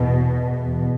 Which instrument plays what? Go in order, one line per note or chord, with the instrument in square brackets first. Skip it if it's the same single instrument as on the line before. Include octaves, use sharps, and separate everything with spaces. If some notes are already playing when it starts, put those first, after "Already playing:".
Already playing: [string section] E2 B2